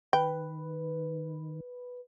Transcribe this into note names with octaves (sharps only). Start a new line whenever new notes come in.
D#3 B4 G5